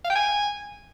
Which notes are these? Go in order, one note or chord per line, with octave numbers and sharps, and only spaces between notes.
F5
G5
G#5